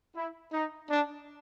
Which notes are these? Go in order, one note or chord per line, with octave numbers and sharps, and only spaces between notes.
E4
D#4
D4